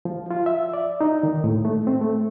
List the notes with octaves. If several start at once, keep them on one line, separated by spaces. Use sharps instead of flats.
F3
F4
E5
D5
D#4
D#3
A2
A3
C4
A3